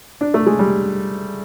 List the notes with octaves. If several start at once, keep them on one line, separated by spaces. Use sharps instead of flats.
D4
A3
G#3
G3